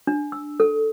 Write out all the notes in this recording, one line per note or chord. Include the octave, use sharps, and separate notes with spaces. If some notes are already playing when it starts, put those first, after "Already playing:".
D4
E6
A4